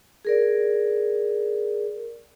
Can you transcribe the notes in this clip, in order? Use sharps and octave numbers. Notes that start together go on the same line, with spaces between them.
G#4 A#4 D5